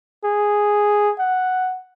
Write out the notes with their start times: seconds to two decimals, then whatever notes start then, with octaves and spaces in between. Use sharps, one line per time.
0.24 G#4
1.19 F#5